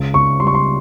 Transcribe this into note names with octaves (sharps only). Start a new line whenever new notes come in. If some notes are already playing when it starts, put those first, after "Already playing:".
Already playing: C#2
C#2 C#6
G3 C6
C#6
C6